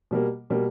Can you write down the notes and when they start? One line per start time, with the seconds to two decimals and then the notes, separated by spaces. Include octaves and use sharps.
0.11 B2 G3 A#3
0.50 B2 G3 A#3